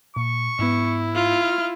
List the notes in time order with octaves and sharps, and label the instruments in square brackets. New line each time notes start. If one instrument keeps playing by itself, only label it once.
[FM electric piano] A#2 [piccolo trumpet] C#6
[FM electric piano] G#2 B3 [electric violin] E4
[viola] F4 [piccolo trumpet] F6